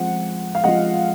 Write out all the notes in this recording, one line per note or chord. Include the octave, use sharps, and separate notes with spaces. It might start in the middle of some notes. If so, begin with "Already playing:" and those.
Already playing: F3 G#3 C4 F4 F#5
F5
F3 G#3 C4 F4 D#5 F#5